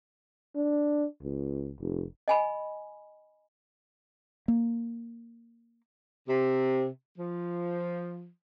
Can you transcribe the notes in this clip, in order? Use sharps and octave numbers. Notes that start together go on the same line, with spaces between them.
D4
C#2
F1
D#5 G#5 B5
A#3
C3
F3